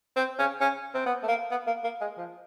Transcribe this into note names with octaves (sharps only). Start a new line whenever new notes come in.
C4
C#4
C#4
C4
B3
A3
A#3
B3
A#3
A#3
G#3
F3